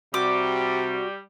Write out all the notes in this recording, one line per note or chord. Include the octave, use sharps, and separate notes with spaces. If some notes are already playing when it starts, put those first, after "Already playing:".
C3 G3 F#4 D6